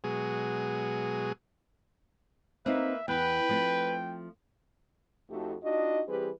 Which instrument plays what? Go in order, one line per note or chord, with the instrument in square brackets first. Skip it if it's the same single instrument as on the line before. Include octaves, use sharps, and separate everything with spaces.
[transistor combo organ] B2 F#3 G#3 G#4
[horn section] A#3 B4 [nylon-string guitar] C4 D#4 [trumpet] E5
[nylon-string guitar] E2 [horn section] B4 [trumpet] G5
[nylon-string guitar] F3 A3 C4
[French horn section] F2 A3 D#4 F#4 G4 A4
D4 D#4 F4 F#4 D#5
E3 G3 C4 G4 G#4 B4